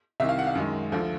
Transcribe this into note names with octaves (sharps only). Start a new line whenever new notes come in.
C2 C3 D#3 E5
F5
F#5
F5
F#2 D#3 G#3
D2 D3 F3